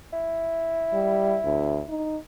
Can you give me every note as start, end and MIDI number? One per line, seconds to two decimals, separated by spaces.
0.13 1.89 64
0.93 1.37 55
1.45 1.82 38
1.89 2.17 63